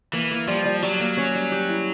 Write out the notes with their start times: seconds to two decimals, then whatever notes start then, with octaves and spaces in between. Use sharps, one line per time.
0.13 E3 A#3
0.31 A#3
0.48 F3 G3
0.65 G3
0.82 F#3 G3
1.00 A#3
1.17 C#4
1.35 G3
1.52 G4
1.69 E4